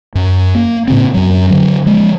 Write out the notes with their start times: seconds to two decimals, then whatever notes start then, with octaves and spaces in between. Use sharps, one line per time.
0.15 F#2
0.55 A#3
0.88 A2 C#3 C4
1.14 F#2 F#3
1.50 D3 F#3
1.86 F3 G#3